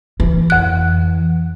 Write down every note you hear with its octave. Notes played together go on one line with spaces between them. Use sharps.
E3
F2 F#6